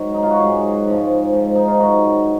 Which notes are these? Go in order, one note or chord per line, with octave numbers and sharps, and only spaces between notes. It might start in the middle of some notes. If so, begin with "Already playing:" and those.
Already playing: G#2 D#3 F#3 C#5
D#4
F4
F#4
G#2 F#3 G#4
G#2 F3
G#2 F3
D#4
F4
G#2 D#3 F#3 F#4